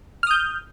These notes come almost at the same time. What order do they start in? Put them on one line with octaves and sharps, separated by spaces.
F6 D#6 G6